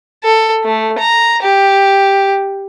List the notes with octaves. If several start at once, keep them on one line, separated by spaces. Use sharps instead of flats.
A4
A3
A#5
G4